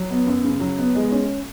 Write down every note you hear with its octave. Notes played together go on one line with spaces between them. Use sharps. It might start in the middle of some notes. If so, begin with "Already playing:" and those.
Already playing: F#3
B3
F#2
C#3
F#3
B3
G#3
C#4